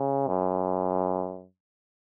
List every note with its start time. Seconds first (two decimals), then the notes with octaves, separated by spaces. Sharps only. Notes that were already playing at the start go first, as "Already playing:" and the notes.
Already playing: C#3
0.28 F#2